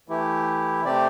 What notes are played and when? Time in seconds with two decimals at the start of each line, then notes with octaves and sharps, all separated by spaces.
0.08 E3 A3 E4 G4
0.84 C3 A3 C4 G4 D5